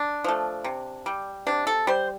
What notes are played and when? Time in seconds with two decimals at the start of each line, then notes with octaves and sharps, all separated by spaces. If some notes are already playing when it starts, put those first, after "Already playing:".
Already playing: D4
0.24 F3 A3
0.64 C3
1.06 G3
1.47 C3 D4
1.67 A4
1.87 G3 C5